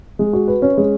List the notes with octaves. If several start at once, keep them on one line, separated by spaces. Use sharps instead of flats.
G#3
F#4
B4
C#4
G#3